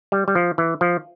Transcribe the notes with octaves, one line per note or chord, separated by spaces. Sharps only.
G3
G3
F3
E3
F3